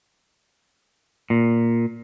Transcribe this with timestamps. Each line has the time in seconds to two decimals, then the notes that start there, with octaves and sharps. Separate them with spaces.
1.30 A#2